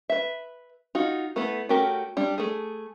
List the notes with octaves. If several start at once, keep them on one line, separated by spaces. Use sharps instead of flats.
B4 E5
D#4 F4 F#4
A3 B3 E4 A4 B4
A3 C#4 F#4 G4 A#4
G3 D4
A3 G#4